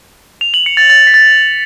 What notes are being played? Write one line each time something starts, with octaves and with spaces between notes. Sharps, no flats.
F7
F#7
C#7
A6
A6
B6
A6